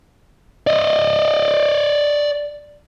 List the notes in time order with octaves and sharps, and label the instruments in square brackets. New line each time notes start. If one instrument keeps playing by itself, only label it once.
[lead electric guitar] D5 D#5